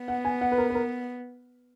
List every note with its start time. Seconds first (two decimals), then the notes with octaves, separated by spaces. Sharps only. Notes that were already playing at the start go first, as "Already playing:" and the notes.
Already playing: B3
0.08 F#5
0.25 G#5
0.41 F#5
0.52 B4
0.58 A#4
0.70 B4
0.75 A#4